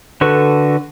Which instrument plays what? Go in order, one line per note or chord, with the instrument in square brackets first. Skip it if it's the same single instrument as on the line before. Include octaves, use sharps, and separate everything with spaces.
[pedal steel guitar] D3 F#4 A4 B4 C#6